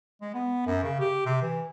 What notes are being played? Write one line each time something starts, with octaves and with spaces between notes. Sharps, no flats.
G#3
B3
F#2
C#3
G4
C3
E3